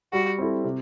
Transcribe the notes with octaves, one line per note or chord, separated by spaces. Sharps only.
G3 F#4
C4 E4 A4
C3